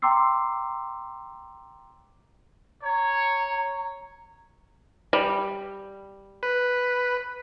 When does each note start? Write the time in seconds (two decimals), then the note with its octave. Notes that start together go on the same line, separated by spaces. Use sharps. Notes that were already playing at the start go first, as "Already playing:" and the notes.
0.02 G5 A#5 C6 D6 E6 C7
2.83 C#5 A#5
5.13 G3
6.43 B4